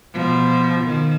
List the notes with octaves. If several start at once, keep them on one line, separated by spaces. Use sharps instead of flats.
B2 F3
D#3